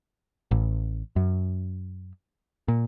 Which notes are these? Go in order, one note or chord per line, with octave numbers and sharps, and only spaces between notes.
A1
F#2
A#2